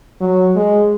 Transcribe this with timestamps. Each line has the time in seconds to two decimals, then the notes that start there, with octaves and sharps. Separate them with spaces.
0.20 F#3
0.56 G#3